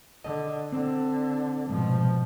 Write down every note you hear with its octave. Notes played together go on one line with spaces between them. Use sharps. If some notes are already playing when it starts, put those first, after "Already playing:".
D3 D#5
D3 C4
C2 G#2 B2 F3